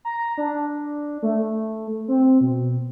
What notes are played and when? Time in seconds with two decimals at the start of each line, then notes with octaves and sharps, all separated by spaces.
0.05 A#5
0.38 D4
1.22 A3
2.08 C4
2.41 B2